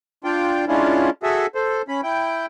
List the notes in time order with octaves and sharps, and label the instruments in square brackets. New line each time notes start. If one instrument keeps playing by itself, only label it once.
[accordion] D4 F4 G5
G#3 C#4 D4 E4 F4
F#4 G#4 A4 E5
A4 C5
C#4 B5
E4 G5